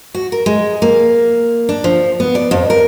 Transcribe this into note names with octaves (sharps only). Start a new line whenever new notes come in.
F#4
A#4
G#3
A#3
D4
F3
B3
D5
F2
A#4